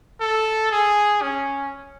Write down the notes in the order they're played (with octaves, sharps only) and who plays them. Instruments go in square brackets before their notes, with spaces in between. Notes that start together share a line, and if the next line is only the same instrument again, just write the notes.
[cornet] A4
G#4
C#4